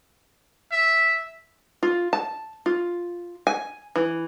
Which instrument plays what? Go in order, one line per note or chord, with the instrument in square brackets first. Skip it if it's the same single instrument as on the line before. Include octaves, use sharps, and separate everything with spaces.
[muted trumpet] E5
[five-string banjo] F4
A5
F4
G#5
E3